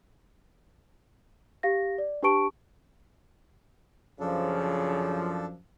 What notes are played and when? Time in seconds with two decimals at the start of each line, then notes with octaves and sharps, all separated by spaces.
1.63 G4 F5 A#6
1.98 D5
2.23 D4 G4 B4 A5 C#6 D7
4.20 F#2 C#3 F3 D4 A4